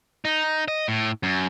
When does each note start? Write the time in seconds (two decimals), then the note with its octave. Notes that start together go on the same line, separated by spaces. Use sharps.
0.25 D#4
0.68 D#5
0.88 A2
1.23 F#2